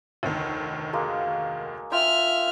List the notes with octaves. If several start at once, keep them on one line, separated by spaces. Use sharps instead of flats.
F1 D2 D#3 C#5
G#3 A#3 F#4
F4 E5 G5 C6 F6